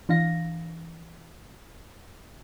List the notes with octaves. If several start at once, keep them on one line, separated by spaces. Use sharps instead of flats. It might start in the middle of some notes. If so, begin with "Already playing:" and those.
E3 D4 F5 A#6